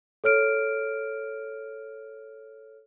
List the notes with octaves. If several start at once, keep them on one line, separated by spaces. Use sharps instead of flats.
A4 C#5 F6 D7